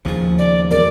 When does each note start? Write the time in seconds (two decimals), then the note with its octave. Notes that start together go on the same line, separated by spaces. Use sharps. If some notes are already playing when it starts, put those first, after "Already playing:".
0.05 D#2 C#3 F3 G#4
0.39 D5
0.71 E1 A#4 D5